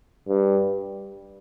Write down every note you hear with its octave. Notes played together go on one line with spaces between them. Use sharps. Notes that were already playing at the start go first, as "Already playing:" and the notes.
G2